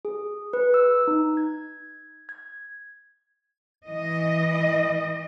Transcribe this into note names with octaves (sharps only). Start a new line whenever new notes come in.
G#4
B4
E6
D#4
G#6
G#6
E3 D#5